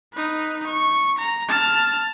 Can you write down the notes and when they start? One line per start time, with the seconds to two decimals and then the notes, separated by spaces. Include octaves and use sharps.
0.14 D#4 B4
0.67 C#6
1.18 A#5
1.49 A5 F6